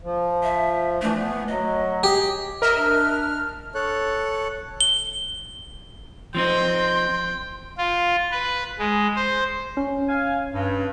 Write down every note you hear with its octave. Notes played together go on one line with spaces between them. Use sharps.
F3
E5
E3 A3 D4
B3
F#3 D#5
G4 G#4
A#4 D#5 E5 F6
D4
A4 C#5 F#6
G7
F3 C4 D#4 G5 C6
F4
B4
G#3
C5
C#4
F5 G#5
G2